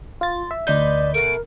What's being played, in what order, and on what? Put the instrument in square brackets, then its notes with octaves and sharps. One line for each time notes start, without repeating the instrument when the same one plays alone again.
[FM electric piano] F4 A6 [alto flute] C6
[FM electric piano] E5
[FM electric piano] D2 G6 [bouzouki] D#4 B4 C5 [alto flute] D5
[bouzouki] B2 A3 [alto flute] A#4 [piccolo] D7